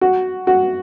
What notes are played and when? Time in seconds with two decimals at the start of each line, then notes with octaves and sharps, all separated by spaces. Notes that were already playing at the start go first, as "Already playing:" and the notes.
0.01 F#4
0.47 F#4